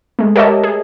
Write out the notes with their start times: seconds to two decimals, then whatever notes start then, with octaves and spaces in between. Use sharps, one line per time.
0.19 G#3 A3
0.36 G4 A#4 C#5 D#5 E5 A5
0.64 G#4